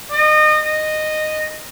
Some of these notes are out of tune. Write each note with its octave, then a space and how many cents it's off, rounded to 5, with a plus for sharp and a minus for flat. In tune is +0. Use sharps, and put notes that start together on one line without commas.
D#5 -30
D#5 -10